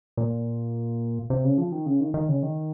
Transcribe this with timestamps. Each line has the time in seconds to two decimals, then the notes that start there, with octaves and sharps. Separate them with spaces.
0.17 A#2
1.30 C3
1.44 C#3
1.58 F3
1.72 D#3
1.86 C#3
2.00 D#3
2.14 D#3
2.29 C#3
2.43 D#3